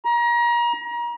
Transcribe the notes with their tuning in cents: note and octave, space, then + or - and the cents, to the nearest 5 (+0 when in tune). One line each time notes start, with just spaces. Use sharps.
A#5 +30